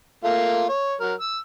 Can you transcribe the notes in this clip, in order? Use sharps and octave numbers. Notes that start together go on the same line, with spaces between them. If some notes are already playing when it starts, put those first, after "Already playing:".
A3 A#3 F4
C#5
F#3 A#4
E6